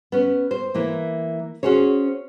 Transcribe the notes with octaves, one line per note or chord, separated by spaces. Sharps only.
B3 C#4
C5
E3 A#3
C#4 F#4 G#4 C5 C#5